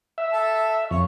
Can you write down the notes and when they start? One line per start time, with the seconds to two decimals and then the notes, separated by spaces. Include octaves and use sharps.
0.18 E5
0.33 A4 A5
0.91 F2 C#5